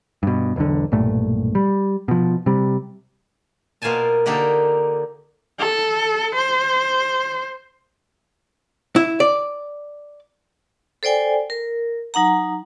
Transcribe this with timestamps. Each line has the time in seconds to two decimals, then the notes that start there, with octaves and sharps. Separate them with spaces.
0.23 G2 B2
0.56 E1 B1 D3
0.92 B1 G2 A#2 A3
1.55 G3
2.08 B2 F3
2.46 C3 G3
3.82 B2 A#3 F4 C5 G#5 A5
4.26 D3 A#3 D#4 G4 A4
5.60 A4
6.35 C5
8.96 E4
9.20 D5
11.03 A4 C5 D5 G5 G#5
11.50 A#4
12.14 F#3 D#4 F#5 A#5